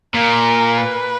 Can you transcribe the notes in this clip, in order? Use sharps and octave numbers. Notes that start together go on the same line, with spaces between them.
A#2 A#4
B4